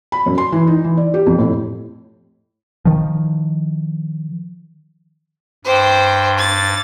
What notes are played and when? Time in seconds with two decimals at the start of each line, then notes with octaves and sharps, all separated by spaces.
0.12 B5
0.26 F#2
0.38 C6
0.52 E3
0.67 D#4
0.84 E3
0.97 D5
1.14 G4
1.26 F2
1.38 A2
2.85 D#3 F3
5.65 G2 C5 G5
6.38 A6